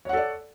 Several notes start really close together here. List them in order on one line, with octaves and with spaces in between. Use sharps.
C#5 F#5 A4 D5